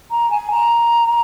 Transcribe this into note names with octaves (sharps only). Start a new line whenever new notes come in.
A#5
G#5
A#5